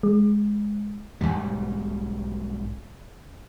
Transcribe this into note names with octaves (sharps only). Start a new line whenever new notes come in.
G#3
B1 E2 G#2 G3